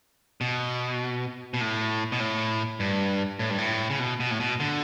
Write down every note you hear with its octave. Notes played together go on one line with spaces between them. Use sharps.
B2
B2
A2
B2
A2
G2
A2
G2
A2
C#3
B2
B2
A2
B2
D3